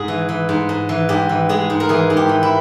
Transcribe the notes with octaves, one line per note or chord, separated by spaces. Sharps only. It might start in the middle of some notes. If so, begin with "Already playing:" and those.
Already playing: G#2 G#4
E3
E3
G#2
G#2
E3
G#2 G4
E3
G#3 G#4
G#2
A#4
E3 G#4
G#2
G4
E3
E4